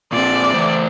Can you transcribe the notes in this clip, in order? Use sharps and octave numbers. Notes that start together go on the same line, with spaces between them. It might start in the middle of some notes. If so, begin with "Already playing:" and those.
A#2 C4 D5
E3 A3 C5